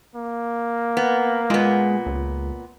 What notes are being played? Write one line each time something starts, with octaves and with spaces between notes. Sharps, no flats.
A#3
B3
A#2 G#3 B3
C#2